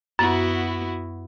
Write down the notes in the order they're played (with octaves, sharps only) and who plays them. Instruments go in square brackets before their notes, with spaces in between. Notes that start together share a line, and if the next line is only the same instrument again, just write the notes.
[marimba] F#2 [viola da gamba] B3 E4 F#4